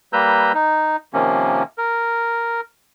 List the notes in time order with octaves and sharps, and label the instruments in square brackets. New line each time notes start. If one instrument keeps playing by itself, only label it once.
[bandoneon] G3 A#3 B4 A#5 E6 G6
D#4
C3 D#3 F3 A#3 C#4
A#4